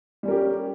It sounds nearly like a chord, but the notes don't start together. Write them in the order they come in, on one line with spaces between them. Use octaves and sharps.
G3 C#4 A#4 G4